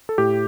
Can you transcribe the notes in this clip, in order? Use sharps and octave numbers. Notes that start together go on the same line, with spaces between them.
A4
A2 G4